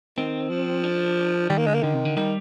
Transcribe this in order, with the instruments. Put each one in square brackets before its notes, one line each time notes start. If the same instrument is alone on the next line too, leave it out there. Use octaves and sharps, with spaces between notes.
[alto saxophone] D#3 [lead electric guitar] C4
[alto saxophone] F3
[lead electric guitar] D4
[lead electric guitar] D#3 [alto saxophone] G3
[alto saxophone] A#3
[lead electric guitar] D3 [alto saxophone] G#3
[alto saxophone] A#3
[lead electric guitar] D3 [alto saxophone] D#3
[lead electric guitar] C3
D3
[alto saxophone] D#3 [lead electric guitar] G3